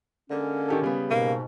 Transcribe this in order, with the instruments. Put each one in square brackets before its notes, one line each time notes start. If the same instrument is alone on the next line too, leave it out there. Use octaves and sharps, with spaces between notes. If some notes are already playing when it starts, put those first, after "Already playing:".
[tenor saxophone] D3 [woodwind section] G#3 A#3 C#4
[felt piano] D#3 G4 A4
C#3 G3 B3
[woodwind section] G#2 B2 [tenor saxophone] A#3